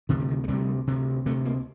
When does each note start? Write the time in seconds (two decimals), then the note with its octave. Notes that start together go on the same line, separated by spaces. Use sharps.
0.09 D2 C3 D#3
0.19 D3
0.28 D#3
0.44 A3
0.48 D2 C3 G3
0.87 D2 C3
1.25 D2 C3 A3
1.45 A#3